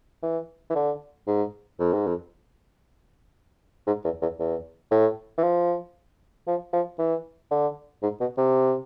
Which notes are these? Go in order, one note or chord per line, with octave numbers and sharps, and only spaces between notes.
E3
E3
D3
G#2
F2
G#2
F2
G#2
E2
E2
E2
A2
E3
F3
F3
F3
E3
D3
G#2
B2
C3